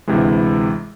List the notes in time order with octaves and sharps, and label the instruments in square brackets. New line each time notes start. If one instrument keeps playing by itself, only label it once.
[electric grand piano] D2 C3 E3 G#3